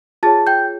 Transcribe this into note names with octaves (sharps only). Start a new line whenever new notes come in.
F4 G#4 C#5 A5 A6
G5 G6